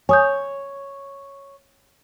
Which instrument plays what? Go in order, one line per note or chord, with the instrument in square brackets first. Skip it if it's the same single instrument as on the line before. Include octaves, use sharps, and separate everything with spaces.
[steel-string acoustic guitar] C#5 [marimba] G#5 D#6 G6